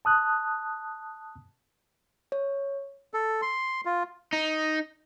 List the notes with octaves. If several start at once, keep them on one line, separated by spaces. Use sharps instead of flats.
A5 D#6 F#6
C#5
A4
C6
F4
D#4